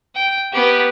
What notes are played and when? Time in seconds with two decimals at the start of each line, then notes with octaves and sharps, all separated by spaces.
0.15 G5
0.52 B3 G4